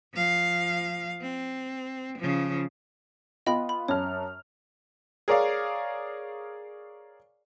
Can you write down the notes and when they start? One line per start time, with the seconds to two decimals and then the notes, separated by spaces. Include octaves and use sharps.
0.13 F3 F5
1.21 C4
2.18 C#3 F3
3.47 B3 F4 D#5 G5 B5
3.69 B5
3.88 F#2 C#5 A5 F6
5.28 G#4 A#4 C#5 D5 F5